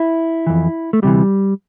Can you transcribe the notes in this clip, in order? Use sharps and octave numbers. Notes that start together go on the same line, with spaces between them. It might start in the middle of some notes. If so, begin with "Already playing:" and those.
Already playing: E4
F2 E3
A3
D2 C3 E3 G3